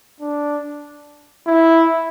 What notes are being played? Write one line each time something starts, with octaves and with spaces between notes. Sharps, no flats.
D4
E4